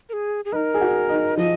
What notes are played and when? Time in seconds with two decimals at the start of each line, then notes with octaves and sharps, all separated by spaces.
0.09 A#4
0.13 G#4
0.45 G#4
0.52 D#4 B4
0.56 A#4
0.74 G#4
0.81 F#4
1.09 D#4
1.37 F3 D#5